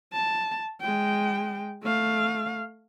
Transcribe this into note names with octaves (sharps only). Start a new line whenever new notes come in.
A5
G#3 G5
A3 F5